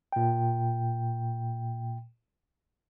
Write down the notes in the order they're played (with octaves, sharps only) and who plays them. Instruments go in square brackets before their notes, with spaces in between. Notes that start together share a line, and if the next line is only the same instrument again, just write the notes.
[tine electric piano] A#2 G5